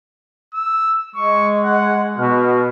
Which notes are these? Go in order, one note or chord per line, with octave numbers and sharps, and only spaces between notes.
E6
G#3 C#6
F#5
B2 F#4 F6